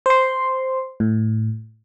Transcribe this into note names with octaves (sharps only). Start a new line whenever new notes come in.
C5 C6
A2